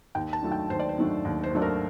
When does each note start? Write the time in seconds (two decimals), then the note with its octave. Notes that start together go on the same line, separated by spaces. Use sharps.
0.15 D#2 G5
0.33 A5
0.42 D#3 F#3 A3 D4
0.52 G5
0.70 D#2 C5
0.79 D5
0.89 C5
0.98 D#3 F#3 A3 D4
1.25 D#2
1.43 C5
1.53 D#3 F#3 A3 D4
1.62 A#4